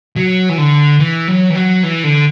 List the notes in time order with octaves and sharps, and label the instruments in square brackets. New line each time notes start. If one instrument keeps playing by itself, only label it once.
[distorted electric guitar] F#3
E3
D3
E3
F#3
E3
F#3
E3
D3